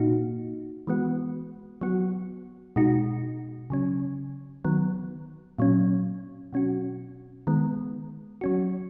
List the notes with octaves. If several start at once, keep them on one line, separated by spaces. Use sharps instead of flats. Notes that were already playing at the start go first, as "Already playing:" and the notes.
Already playing: A#2 A#3 D#4 F#4
E3 G#3 B3 F#4
F#3 B3 F#4
B2 G#3 D#4 F#4
C#3 F#3 C#4
D#3 F#3 B3
A#2 F#3 C#4
B2 F#3 C#4 F#4
D#3 G#3 B3
F#3 C#4 F#4